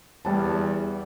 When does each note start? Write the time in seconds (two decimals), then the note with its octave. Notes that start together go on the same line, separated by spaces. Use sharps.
0.25 E2 G3 A5